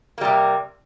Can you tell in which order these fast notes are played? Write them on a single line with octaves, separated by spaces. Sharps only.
A#3 G3 C3